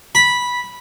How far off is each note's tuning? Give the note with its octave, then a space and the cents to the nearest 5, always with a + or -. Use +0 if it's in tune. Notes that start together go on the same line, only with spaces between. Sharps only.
B5 -10